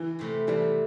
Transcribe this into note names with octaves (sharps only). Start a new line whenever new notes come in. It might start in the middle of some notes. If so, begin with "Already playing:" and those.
Already playing: E3
C3 A3 E4 G4 C5
E3 G3 C4 A4